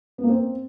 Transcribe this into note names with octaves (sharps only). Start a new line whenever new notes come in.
B3
A#3
C4